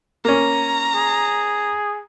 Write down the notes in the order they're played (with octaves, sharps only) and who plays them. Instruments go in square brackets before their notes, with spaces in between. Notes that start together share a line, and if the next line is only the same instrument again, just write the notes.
[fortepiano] A#3 C#4 [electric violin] A#5
[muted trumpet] G#4